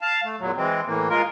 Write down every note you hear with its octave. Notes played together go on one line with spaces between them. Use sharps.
F5 A5
A3
E2 A#2 F#3
E3 G#3 C4
A2 E3 A#3
G#3 F4 A#4